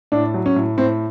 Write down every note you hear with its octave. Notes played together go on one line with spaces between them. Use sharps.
A2 D4
F#3
C#4
A2
A2 C4